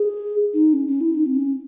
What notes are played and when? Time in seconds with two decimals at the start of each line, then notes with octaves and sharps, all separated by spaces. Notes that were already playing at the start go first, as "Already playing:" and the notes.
Already playing: G#4
0.54 D#4
0.73 C#4
0.87 C#4
1.01 E4
1.15 D#4
1.26 C4
1.35 C#4